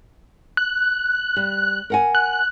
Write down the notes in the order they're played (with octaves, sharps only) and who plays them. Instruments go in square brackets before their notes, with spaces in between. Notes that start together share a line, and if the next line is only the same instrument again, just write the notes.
[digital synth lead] F#6
[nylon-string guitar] G3
A#4 F#5 G#5
[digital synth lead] F#6